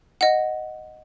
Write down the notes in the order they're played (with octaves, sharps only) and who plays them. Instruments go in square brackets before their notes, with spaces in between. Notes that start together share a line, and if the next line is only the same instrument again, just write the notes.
[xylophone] D#5 F#5